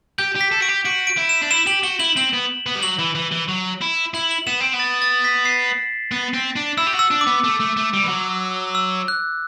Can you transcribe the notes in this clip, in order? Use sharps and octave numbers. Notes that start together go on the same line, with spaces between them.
G4 G6
G4
B6
A4
F#4 D7
G4
F#4 D7
D7
E4
E7
D4
E4 E7
G4 F#7
F#4 G7
E4 F#7
C4 F#7
B3
B3
G3
F#3 F#7
E3
E3
E3
F#3
E4
E4 F#7
F#7
B3 E7
C4 D7
B3
A6
A6
B6
C7
B3
C4
D4
E4 E6
G4
F#4 E6
D4
D6
B3
A3
A3
A3
G3
E3
F#3
E6
F#6